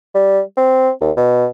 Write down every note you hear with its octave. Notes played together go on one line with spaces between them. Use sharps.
G3
C4
D#2
B2